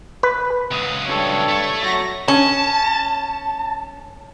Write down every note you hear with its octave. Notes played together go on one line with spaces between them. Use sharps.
B4
C#2 F#3 D#6
G2 A4 C#5
A3
F#3 C#6 A#6
C#4 A5